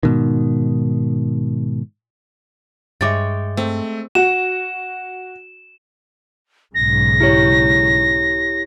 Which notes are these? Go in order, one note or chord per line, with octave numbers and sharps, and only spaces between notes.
G#2 B2 D#3
G2 G#3 C#5 E5 G5 D6 A6
A3 C4
F#4 E7
B1 G#2 C#3 A#6
E4 G4 C#5